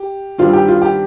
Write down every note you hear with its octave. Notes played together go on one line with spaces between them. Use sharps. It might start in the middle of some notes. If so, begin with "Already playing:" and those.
Already playing: G4
G2 D#3 G3 C4 F4
G4
F4
G4